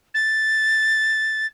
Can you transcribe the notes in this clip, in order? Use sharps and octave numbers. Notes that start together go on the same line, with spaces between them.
A6